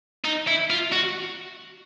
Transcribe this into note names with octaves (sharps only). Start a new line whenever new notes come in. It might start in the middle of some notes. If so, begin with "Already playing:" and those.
D#4
E4
F4
F#4